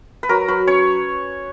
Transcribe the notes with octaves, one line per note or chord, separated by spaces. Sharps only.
B4
F#3 A#4
F#3 B4
C#4 C#5